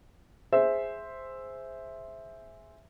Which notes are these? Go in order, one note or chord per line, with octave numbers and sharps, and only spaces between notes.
G#4 C5 E5